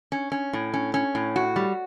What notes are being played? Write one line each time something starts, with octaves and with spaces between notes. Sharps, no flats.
C#4
C#4
A2
C#4
C#4
A2
F#4
G3